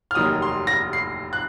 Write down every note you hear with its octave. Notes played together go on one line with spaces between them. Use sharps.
F6
F1 D#2 D#3 F#3 D#6
C6
A#6
C7
F#6